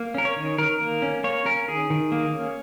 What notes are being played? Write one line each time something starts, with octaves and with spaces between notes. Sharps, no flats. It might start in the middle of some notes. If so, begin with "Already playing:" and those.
Already playing: A#3
C#4 A#4
C#5
D#3
D#3 A#4
A#3
C#4
A#3 C#5
C#4 A#4
D#3 G#4
D#3
A#3
C#4